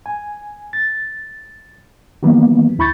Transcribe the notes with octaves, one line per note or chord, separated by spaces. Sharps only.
G#5
A6
D#3 E3 F#3 G3 A#3 B3
D2 E4 B5 C#6 G6 A6